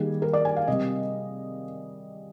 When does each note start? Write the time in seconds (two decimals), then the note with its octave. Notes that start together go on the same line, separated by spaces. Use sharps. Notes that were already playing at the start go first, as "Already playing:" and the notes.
Already playing: D#3 G3 A#3 G#4
0.22 A#4
0.33 D5
0.45 G#5
0.56 F5
0.68 C3 G3 C4 D#5